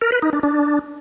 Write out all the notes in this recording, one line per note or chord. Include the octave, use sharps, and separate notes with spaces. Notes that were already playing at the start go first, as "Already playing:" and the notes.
A#4
B4
D#4
D4
D4